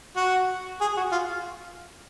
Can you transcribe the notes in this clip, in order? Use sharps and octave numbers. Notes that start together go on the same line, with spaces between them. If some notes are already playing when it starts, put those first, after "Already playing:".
F#4
G#4
F#4
F4